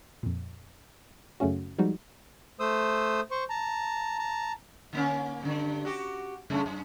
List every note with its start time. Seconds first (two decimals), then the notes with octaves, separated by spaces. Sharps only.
0.23 F2 A#2
1.40 F#2 C#3 A3 C#4 F#4
1.79 F3 G3 G#3 D#4 F#4
2.60 A3 C5 D#6 E6
3.31 C5 C#6
3.50 A5 A#5
4.19 A5 A#5
4.93 D3 A#3 C#4
5.43 G2 D3
5.85 F#4 G4
6.50 F#2 C#3 A3
6.66 F#2